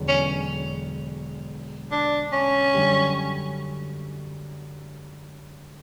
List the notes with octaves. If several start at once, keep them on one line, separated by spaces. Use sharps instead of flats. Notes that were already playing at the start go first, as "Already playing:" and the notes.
Already playing: E1 E2 D3 F#3 B3
C#4
D4
C#4
F#2 D3 G3